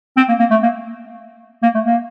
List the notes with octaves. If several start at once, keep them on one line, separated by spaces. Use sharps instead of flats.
C4
A#3
A#3
A3
A#3
A#3
A3
A#3